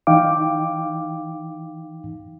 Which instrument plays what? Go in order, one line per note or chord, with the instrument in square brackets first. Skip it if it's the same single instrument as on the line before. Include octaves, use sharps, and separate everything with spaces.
[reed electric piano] E3 D#4 F5 G5 D6